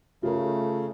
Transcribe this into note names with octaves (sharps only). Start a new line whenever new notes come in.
C#3 A3 F4 A#4